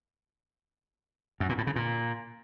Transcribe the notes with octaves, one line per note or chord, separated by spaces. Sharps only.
F#2
A#2
A2
C#3
A#2